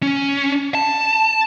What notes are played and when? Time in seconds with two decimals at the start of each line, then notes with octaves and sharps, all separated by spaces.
0.02 C#4
0.75 A5